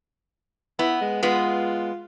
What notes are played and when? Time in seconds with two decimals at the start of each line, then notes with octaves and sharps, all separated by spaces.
0.79 B3 E4
1.01 G#3
1.23 G#3 B3 F4